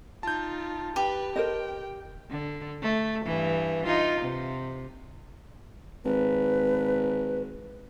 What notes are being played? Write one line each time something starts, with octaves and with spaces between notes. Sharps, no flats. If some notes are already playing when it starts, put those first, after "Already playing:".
D#4 F4 A5 G6
G4 B4
A#4 C5 D#5 G5
D3
A3
G2 E3
D#4 F4
C3
G#1 B4